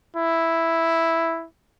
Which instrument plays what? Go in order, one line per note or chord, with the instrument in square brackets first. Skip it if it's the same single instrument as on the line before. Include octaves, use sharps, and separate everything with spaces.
[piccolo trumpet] E4